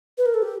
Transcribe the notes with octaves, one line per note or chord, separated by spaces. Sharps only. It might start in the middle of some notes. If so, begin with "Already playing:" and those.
B4
A#4
A4
G4